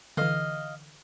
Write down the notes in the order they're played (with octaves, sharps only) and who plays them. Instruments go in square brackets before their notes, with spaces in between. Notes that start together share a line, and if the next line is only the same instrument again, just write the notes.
[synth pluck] D3 E3 [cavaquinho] D#5 F5